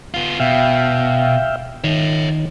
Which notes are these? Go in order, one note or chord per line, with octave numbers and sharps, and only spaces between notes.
B3 F4
B2 E5 F5 G5
D#3 C#5 E5